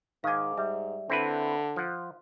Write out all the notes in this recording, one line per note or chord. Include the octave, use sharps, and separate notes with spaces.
G#2 D#3 F5 G#5 D6
G3 E5
D3 C4 E4 B4
F3 F#5